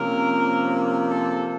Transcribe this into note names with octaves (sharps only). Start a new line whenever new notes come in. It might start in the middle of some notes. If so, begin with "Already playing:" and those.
Already playing: C3 F3 A#3 C#4 A#4
A#4
A4